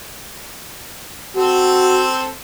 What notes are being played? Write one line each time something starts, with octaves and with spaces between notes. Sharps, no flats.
C4 F#4 A4 C5